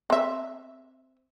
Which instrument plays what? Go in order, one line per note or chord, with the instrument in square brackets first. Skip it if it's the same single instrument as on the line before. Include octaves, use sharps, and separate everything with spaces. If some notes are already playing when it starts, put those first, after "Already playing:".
[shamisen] C4 E5